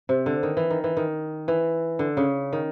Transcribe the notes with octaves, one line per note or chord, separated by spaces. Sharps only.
C3
D3
D#3
E3
D#3
E3
D#3
E3
D3
C#3
D#3